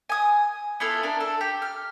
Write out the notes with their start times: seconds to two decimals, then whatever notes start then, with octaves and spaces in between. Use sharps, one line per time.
0.09 G#5 D#6
0.80 B3 E4 F4 A4
1.03 D4 A#4
1.20 A4
1.41 G4
1.62 F6